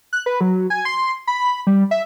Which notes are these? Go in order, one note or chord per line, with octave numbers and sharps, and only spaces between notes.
F#6
B4
F#3
G#5
C6
B5
G3
E5